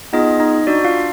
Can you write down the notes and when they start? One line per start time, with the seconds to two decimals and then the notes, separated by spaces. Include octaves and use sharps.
0.13 B3 D#4 F4 G#4 D#5
0.40 D#4 D#5
0.67 D4 F#4 D5
0.84 F4 F5